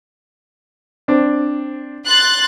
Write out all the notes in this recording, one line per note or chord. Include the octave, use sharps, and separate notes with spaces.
C4 D4
C6 F#6 A6